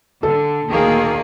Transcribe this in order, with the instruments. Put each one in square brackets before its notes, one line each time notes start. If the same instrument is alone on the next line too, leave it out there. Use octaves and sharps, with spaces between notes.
[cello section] D3 [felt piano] A4
[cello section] D2 A#2 G#4 [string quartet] D#3 A#3